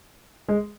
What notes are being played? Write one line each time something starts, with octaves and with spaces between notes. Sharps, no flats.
G#3